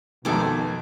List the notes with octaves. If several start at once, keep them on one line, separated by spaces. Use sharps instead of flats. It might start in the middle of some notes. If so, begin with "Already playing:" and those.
B1 F2 B2 D#3 A4 G#5 D6